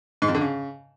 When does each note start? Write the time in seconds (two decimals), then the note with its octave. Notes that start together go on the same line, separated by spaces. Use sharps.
0.22 G#2
0.28 F2
0.35 D3
0.41 C#3